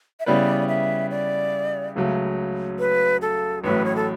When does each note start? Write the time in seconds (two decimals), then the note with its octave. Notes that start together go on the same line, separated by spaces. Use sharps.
0.20 E5
0.26 C#3 G3 B3 E4 B4 D5
0.69 E5
1.11 D5
1.96 C#2 C#3 F#3 A3
2.79 B4
3.22 A4
3.64 A1 A2 F#3 B4
3.85 C#5
3.96 A4